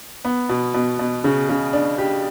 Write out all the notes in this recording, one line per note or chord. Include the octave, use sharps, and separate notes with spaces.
B3
B2
B2
B2
C#3
C#3
D4
G4